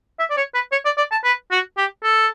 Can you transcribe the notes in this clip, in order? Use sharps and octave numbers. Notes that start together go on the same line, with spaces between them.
E5
D5
C#5
B4
C#5
D5
D5
A5
B4
F#4
G4
A4